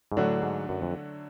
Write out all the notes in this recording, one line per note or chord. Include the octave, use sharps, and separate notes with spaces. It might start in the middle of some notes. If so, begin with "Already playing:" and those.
G#2
A2 D3 F#3 A3 D4 F#4
G#2
F#2
F2